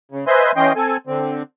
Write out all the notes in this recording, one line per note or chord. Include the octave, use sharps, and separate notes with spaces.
C#3
B4 C5 D#5 E5 G#5 C6
E3 C#4 D#5 G5 C6
C4 A4 G#5
D3 C4